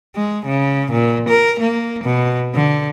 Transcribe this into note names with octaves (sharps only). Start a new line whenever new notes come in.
G#3
C#3
A#2
A#4
A#3
B2
D3